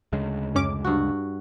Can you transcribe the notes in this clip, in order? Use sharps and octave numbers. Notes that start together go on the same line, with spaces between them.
D2 C#3 G#3
F#2 C#4 D6
G2 F#4